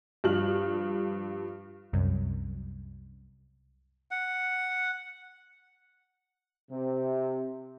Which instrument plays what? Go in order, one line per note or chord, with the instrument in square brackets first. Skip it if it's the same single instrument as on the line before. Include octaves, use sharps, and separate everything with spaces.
[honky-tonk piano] G2 F3 F6 F#7
[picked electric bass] C2 [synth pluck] F#2
[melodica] F#5
[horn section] C3